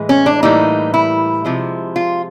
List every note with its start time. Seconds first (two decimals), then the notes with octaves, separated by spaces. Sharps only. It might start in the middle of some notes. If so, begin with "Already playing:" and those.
Already playing: A2 E3 G#3
0.09 C#4
0.26 D4
0.43 A2 E3 G3 A#3 D#4
0.94 E4
1.44 C3 F3 G#3
1.96 F4